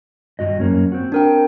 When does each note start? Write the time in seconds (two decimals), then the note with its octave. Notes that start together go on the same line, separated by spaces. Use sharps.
0.39 G2 F#4 D#5
0.60 F#2 A#3 C#4
0.92 C4 F#4
1.12 D4 A#4 G5